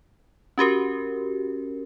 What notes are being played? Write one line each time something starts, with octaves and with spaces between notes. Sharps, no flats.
C#4 F#4 G4 A#4